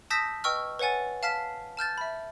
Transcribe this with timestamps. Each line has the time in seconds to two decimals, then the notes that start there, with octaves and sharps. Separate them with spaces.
0.10 A5 D#6 E6 G6 A#6 B6
0.44 B4 D#5 G5 C#6 E6 F6
0.79 B4 C#5 F#5 G#5 A6
1.23 F5 A5 F6 B6 C7
1.77 A5 F6 G6 A6
1.98 E5 B5